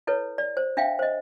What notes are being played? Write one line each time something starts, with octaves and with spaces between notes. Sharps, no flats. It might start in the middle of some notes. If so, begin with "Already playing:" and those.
E4 A4 B4 C#5
D5
C5
D4 E5 F5 G5
C5 D#5